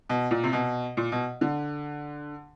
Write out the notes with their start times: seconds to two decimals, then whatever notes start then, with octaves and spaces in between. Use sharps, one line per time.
0.10 B2
0.31 A#2
0.44 C3
0.53 B2
0.97 A#2
1.12 B2
1.41 D3